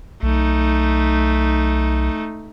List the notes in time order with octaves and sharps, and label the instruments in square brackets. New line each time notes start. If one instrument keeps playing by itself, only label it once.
[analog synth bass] B1 [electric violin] A3 D#4